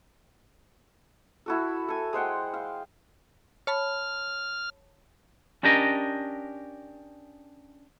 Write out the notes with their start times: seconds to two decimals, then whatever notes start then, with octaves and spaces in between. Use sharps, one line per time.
1.46 E4 F#4 A4
1.88 A4 G#5
2.13 G#3 C5 F#5 G5
2.54 F5
3.67 C#5 A5 B5 F6
5.63 C#4 D4 G4 A#4 D#5